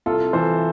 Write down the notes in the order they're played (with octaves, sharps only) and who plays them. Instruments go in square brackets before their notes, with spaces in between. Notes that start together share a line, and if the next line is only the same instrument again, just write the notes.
[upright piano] C2 F4 A4
E3 A4 C5